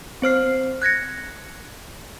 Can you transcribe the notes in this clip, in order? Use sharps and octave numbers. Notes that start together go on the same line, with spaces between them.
C4 C5 F6 C7
F#6 G#6 A#6 C#7